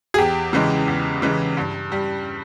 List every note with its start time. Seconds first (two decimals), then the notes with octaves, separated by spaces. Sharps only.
0.14 G#4
0.18 E2 G4
0.53 C#3 E3 G#3
0.88 E2
1.22 C#3 E3 G#3
1.57 G2
1.92 G3